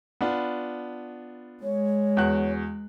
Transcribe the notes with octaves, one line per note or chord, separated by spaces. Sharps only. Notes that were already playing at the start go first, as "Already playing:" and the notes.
B3 D4 F4
G#3 C#5
E2 F#4 F#6